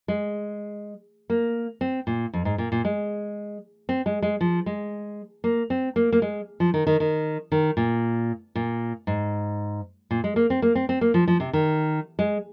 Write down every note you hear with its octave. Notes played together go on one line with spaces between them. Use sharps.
G#3
A#3
C4
A#2
F2
G#2
A#2
A#2
G#3
C4
G#3
G#3
F3
G#3
A#3
C4
A#3
A#3
G#3
F3
D#3
D#3
D#3
D#3
A#2
A#2
G#2
A#2
G#3
A#3
C4
A#3
C4
C4
A#3
F3
F3
C3
D#3
G#3